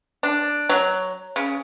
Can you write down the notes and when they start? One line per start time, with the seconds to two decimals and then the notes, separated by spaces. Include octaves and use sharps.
0.23 D4
0.69 F#3
1.36 C#3